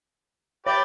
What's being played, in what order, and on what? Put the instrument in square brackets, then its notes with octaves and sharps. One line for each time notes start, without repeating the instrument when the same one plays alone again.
[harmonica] G4 B4 D5 [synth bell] C#5